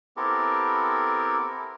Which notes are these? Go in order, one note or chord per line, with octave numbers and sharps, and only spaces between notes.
B3 C4 E4 G4 A4 A#4